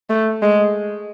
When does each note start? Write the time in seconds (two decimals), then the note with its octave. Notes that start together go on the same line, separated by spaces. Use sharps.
0.10 A3
0.42 G#3